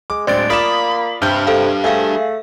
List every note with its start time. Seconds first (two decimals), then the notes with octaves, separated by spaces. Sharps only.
0.10 G#3 D6
0.27 D1 G#3 C4 D4 D5 A6 D7
0.50 A#3 F4 D5 B5 D#6 B6 E7
1.22 G2 C3 G3 D4 F6 G6 G7
1.47 C3 A4 C5 F5
1.84 A3 G#4 E5 F5